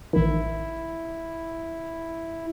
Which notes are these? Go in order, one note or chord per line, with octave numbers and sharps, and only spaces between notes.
A1 D#3 E4